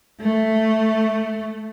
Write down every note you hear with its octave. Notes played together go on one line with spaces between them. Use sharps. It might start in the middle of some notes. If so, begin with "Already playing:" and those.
A3